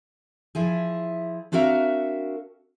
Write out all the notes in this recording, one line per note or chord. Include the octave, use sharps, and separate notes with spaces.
F3 E4 G#4
C4 D4 F#4 A#4 E5 F5